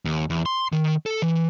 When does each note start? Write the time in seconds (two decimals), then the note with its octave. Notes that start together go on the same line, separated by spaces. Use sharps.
0.05 D#2
0.30 E2
0.46 C6
0.73 D#3
1.06 A4
1.22 E3